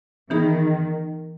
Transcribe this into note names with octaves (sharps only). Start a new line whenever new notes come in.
D#3 E3 B3 D#4 G#4